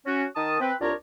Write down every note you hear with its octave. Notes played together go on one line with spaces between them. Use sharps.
C#4 F#4
D#3 A5 D#6
C4 B4
C2 D4 F4 A#4 C#5 A#5